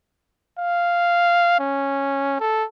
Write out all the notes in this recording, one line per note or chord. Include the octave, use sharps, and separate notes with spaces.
F5
C#4
A4